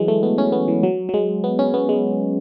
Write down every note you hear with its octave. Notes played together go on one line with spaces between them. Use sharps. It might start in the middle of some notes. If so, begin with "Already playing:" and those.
Already playing: E3 F#3 G#3
A3
B3
C#4
B3
E3
F#3
F#3
G#3
B3
C#4
B3
G#3